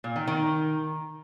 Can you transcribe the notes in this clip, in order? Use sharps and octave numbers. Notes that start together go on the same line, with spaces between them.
A#2
D#3
D#3